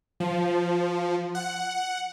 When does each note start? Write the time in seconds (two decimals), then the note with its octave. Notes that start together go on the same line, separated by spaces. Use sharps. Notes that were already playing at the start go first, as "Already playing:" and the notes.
0.20 F3
1.35 F#5